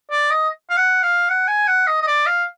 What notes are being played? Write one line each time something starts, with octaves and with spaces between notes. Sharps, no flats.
D5
D#5
F5
F#5
F5
F#5
G#5
F#5
D#5
D#5
D5
F5